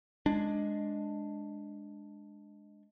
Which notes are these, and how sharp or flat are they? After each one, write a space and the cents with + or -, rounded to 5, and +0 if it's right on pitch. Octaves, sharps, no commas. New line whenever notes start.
G#3 +0 D4 +0